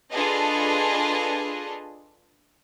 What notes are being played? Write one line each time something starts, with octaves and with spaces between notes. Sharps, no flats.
D4 F4 G#4 A4 B4 D#5